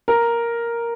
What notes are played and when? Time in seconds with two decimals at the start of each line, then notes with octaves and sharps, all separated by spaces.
0.08 A#4